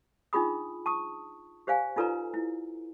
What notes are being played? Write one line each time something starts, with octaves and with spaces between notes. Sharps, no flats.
D4 D#4 F4 G#4 B5 D#6
A5 C#6 D#6
G4 C5 D5 F5 G#5
D#4 F4 A4 B4 D5 A#5
E4